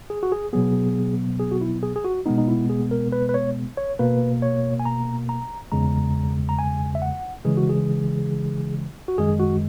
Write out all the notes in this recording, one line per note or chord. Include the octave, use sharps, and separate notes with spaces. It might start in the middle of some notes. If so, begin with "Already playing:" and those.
G#4
F#4
G#4
B2 F#3 B3 G#4
G#4
F#4
E4
G#4
G#4
F#4
B2 G#3 B3 D#4
D#4
E4
G#4
A#4
B4
B4
C#5
C#5
B2 A#3 B4
C#5
G#5
A#5
A#5
E2 C#3 G#3 A#5
A#5
G#5
E5
F#5
C#3 E3 G#3 G#4
F#4
G#4
F#4
F#2 D#3 G#3 G#4
F#4